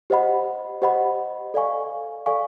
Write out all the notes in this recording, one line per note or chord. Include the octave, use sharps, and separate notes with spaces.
G4 C5 D#5 F#5 B5
G4 C5 D#5 F#5 B5
A4 D5 F5 G#5 C#6
A4 D5 F5 G#5 C#6